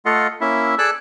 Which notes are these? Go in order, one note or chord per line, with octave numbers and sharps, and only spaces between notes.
A3 F4 A4 D#5 F5 F#5
A#3 C#4 E4 E5
G#4 A4 D5 A5 E6 F#6